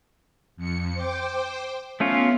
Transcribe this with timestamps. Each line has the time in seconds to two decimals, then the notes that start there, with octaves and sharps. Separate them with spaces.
0.56 F2 C#7
0.94 C5 G5 D6
2.00 A3 B3 C#4 F4